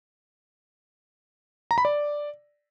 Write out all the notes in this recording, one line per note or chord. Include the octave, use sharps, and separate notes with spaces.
A#5
B5
D5